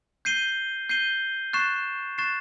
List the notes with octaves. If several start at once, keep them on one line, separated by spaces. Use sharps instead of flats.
G6 C7 D#7 G7
G6 C7 D#7 G7
C#6 F#6 A6 C7 E7
C#6 F#6 A6 C7 E7